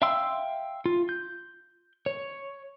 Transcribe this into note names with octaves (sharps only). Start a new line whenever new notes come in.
E5 F5 G5 C6 E6
F4
G6
C#5